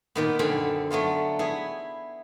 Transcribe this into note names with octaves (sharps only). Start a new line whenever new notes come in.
A#2 D#3 B3
F#2 D3 B3 C4 G#5 B5
F#3 A3 B3 F4
B3 E4 G#4